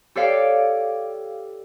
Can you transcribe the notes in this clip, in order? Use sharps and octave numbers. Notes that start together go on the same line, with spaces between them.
G4 A4 C#5 D5 F5 G5